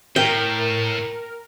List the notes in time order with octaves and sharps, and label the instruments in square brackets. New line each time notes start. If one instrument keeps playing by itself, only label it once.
[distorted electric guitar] A2 [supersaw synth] A#4 [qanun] G5